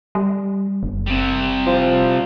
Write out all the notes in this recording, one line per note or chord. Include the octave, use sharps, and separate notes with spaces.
G3
F#1
C3 G3
F3